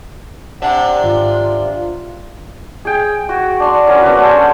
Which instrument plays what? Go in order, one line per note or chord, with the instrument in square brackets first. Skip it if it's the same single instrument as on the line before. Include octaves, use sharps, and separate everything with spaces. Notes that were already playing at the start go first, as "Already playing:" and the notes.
[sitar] C3 D4 [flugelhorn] F#5
[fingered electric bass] G#1 [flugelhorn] F4
[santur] G#4 G5
F#4
D4 C6 C#6
F#3 C#4 A#4
B3 D4 F#4 B4
C#4 A4 C5